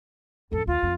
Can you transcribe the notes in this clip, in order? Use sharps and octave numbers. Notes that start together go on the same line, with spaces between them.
A1 F2 A4
D#2 F4
F2